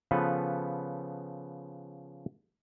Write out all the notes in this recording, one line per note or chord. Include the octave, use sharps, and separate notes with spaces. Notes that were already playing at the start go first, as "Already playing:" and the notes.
C#3 F3 B3 A4 B4